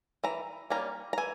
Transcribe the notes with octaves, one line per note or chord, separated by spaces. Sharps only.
E3 A#5
G3 A#3 C#4 A#5
A#5
E3 G#5